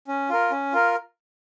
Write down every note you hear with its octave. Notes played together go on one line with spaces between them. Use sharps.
C#4
F4 A#4
C#4
F4 A#4